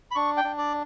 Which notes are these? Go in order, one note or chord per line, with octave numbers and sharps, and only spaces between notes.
B5
D4 C#6
G5
D4
D5